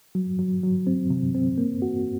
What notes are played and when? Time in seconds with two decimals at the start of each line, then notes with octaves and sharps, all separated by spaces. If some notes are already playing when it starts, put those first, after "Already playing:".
0.15 F#3
0.39 F#3
0.63 F#3
0.87 C4
1.10 C3
1.35 C4
1.58 A#3
1.82 F#4